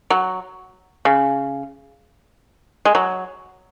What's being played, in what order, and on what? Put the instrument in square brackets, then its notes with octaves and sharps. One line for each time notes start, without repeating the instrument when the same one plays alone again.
[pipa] F#3
C#3
G#3
F#3